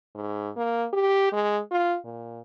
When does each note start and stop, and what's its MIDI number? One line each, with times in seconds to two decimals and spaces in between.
0.15 0.50 44
0.57 0.87 58
0.93 1.32 67
1.33 1.60 56
1.71 1.97 65
2.05 2.40 46